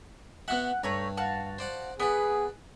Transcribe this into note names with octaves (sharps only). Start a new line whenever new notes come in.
B3 F#4 E5 F#5 F#6
G2 A3 C#5 A#5
F#4 F5 A5
C5 D5 F#5
B3 G#4 B4 D5